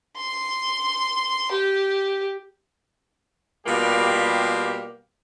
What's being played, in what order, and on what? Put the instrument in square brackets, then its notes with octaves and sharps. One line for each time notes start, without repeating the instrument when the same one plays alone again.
[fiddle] C6
G4
[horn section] B2 G3 A#3 F4 G4